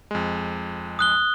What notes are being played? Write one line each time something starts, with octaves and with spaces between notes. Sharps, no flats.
F2 G#3
D#6 F#6 G7